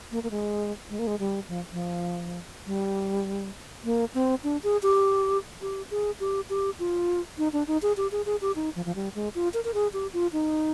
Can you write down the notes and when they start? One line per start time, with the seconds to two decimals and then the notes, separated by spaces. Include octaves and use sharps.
0.12 A#3
0.23 A#3
0.31 G#3
0.90 G#3
0.99 A#3
1.07 G#3
1.19 G3
1.49 F3
1.72 F3
2.67 G3
3.84 A#3
4.14 C4
4.44 D4
4.63 G#4
4.83 G4
5.62 G4
5.91 G#4
6.20 G4
6.50 G4
6.79 F4
7.38 D#4
7.53 D4
7.67 D#4
7.82 G#4
7.97 G4
8.12 G#4
8.26 G#4
8.41 G4
8.56 D#4
8.75 F3
8.85 F3
8.95 G3
9.15 G#3
9.35 F4
9.54 A#4
9.64 A#4
9.74 G#4
9.93 G4
10.13 F4
10.33 D#4